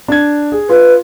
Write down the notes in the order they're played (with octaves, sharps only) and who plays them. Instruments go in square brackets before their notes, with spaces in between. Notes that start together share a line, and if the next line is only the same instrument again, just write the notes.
[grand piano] D4 G#6
G#4
[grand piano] F4 [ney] B4